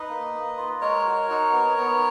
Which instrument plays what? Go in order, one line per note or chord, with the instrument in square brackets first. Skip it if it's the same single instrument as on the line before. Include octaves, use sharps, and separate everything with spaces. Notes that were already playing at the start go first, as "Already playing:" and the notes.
Already playing: [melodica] D#4 B4 D#5
A#3
A#3
F4
G#3 A#4 C#5
F#4
D#4
B3
B3